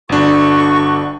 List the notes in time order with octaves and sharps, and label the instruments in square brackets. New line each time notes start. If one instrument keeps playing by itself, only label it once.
[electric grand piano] G1 D4 [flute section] F#4 A4 C#6